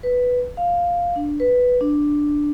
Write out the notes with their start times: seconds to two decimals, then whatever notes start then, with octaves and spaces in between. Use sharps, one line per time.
0.03 B4
0.57 F5
1.16 D4
1.40 B4
1.81 D4